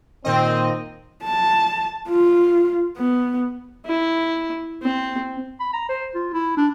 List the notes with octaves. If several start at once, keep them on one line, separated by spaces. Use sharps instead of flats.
A#2 D#3 C4 D#5
A5
F4
B3
E4
C4
B5
A#5
C5
F4
E4
D4